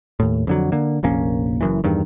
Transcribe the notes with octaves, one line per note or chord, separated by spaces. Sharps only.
D#2 A2
F2 D3 F#3
D3 A#3
F1 A#1 A#3 C#4
F#1 F#2 E3
E2 G2 D#3